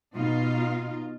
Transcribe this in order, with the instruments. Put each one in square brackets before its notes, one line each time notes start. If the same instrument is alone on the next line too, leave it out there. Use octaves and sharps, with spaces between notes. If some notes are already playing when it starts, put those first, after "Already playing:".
[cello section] B2 D#4 F4